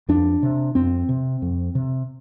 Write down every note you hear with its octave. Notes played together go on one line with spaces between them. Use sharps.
F2 D4
C3
F2 C4
C3
F2
C3